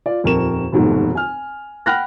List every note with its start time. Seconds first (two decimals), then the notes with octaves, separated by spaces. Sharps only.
0.06 F4 D5
0.24 D#1 F2 A#4 C#6 E7
0.72 F1 D#2 G#2 B2 F#3 A3
1.15 G#5 F6
1.86 F#5 G5 B5 F6 F#6 A#6